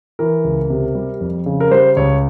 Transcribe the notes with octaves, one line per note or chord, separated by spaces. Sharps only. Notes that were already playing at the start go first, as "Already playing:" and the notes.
E3 A#4
C#2
C3
G3
F2
C#3
A#4
G3 C5
C#2 C#5